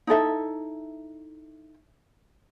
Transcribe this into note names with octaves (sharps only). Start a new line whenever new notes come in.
D#4 E4 A4 E5